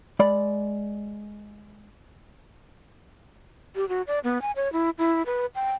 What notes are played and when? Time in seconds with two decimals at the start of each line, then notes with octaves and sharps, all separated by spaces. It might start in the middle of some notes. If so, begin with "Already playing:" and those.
0.19 G#3 D5 B5
3.76 G4
3.89 F#4
4.07 D5
4.24 B3
4.42 G#5
4.56 C#5
4.73 E4
4.98 E4
5.26 B4
5.55 G5